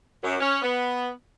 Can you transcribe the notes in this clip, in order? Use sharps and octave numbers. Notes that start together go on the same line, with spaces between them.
F#2
C#4
B3